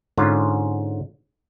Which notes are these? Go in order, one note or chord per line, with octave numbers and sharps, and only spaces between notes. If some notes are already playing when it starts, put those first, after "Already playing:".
G#2 D3 C#4 F4